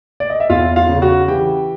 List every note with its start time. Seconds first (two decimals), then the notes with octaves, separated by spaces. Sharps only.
0.20 D5
0.30 D#5
0.40 E5
0.50 E2 F4 F5
0.76 F4 F5
0.89 C#3
1.02 F#4 F#5
1.28 E3 G4 G5